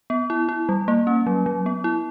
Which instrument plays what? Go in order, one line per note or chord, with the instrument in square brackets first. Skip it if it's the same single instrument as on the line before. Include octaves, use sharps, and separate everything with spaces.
[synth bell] B3
E4
E4
G3
A#3
C#4
F#3
F#3
B3
E4